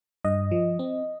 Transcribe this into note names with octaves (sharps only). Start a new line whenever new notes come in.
G2 D#5
F3
C4